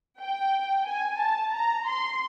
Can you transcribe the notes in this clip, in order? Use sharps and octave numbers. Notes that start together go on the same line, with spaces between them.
G5
G#5
A5
A#5
C6